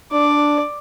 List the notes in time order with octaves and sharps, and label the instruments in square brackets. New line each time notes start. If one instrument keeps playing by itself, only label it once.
[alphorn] D4 [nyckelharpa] D5